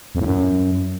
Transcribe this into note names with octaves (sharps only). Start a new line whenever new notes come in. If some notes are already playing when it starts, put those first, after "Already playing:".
F2
A2
F#2